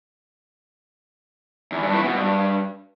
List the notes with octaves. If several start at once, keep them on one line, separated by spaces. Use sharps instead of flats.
E2
G2
E3
B2
G2